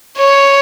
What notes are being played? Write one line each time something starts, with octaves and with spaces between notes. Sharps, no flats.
C#5